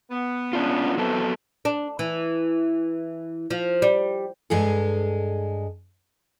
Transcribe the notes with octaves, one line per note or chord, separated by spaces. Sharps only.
B3
C#4 D4 F4
E3 F#3 B3 C4 A4
D4
E3
F3
G3
G2 G#3 G#4 A4